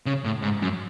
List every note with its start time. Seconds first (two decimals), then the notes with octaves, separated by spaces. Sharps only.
0.06 C#3
0.25 A2
0.42 G#2
0.62 F#2